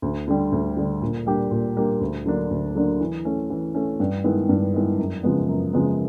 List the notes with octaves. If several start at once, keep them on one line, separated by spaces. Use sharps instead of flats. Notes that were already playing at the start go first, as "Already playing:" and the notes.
D2
D3 G3
D2
D3 G3
A#2
G3 A#3 D4 G4
A#2
G3 A#3 D4 G4
D2
D3 F#3 A#3 D4
D2
D3 F#3 A#3 D4
E3
A3 C#4
E3
A3 C#4
G2
D#3 G#3 B3 E4
G2
D#3 G#3 B3 E4
F#2
C#3 F3 G#3 B3
F#2
C#3 F3 G#3 B3